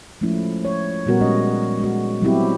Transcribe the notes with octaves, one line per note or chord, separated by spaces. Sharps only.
F3 G#3 A3 C#4 E4
C#5
A#2 G3 B3 F#4 A#4
G#3 B3 C#4 D#5
G#3 F#4
F#3 G3 B3 C4 E4 G4